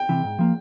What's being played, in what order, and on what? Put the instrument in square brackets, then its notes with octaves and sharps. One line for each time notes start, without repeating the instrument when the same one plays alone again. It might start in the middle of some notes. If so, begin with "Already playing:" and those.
Already playing: [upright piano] G5
[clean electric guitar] C3 E3
G#2
F3 A#3